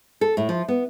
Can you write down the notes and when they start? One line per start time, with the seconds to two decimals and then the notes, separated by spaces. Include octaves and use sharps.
0.21 A4
0.37 A2
0.49 F3
0.68 B3